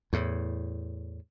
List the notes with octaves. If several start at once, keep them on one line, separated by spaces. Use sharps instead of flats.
E2 A2